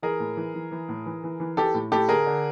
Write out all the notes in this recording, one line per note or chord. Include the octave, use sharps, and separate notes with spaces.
E3 G#4 A#4
A2
E3
E3
E3
A2
E3
E3
E3
E3 G4 A4
A2
A2 G4 A4
D3 G#4 A#4
D3